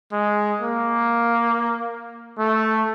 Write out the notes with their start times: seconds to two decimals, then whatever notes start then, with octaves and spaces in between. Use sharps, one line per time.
0.12 G#3
0.62 A#3
2.39 A3